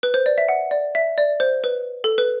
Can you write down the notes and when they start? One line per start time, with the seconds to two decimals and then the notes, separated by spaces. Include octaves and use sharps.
0.03 B4
0.14 C5
0.26 D5
0.38 E5
0.49 F#5
0.71 D5
0.95 E5
1.18 D5
1.40 C5
1.64 B4
2.04 A4
2.18 B4